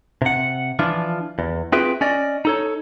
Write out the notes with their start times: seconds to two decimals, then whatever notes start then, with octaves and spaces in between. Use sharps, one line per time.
0.22 C3 F#5
0.79 E3 F3 D4 F4
1.39 E2
1.72 C4 F4 G#4 B4 E5 G5
2.01 C#4 D5 D#5
2.45 D#4 A4 C#5